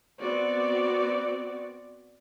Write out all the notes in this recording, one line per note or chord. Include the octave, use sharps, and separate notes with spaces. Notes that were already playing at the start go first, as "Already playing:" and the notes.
B3 C4 F#4 D5